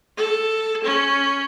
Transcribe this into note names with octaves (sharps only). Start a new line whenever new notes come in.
A4
C#4